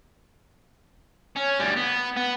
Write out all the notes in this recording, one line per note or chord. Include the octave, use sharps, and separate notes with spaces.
C#4
D2 G3
B3
B3